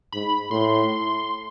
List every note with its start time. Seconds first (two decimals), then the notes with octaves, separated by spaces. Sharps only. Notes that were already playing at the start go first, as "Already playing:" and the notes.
0.12 G#2 B5
0.51 A2 C6